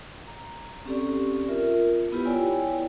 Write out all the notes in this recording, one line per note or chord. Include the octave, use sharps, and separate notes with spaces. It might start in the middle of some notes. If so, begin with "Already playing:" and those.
A#5
C4 C#4 G4 A4 D5
F4 A#4 E5
B3 E4 F4 G4 B4
E4 C#5 D5 G5 G#5